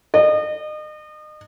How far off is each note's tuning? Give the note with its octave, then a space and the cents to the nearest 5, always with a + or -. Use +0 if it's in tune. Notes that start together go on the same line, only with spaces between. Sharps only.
D#5 -35